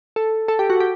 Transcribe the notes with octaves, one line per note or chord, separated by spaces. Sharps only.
A4
A4
G4
F#4
G4